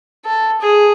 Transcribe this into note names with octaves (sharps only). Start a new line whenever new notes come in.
A4
G#4